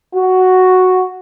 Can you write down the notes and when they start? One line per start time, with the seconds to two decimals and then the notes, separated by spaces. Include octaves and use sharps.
0.16 F#4